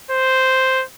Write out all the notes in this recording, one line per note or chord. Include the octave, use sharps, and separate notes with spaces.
C5